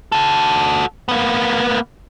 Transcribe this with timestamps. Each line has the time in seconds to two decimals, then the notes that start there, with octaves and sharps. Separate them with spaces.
0.12 F#4 A4
1.09 A#3 B3